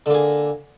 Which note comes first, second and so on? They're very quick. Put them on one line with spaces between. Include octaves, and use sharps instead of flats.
D3 A#3 G#4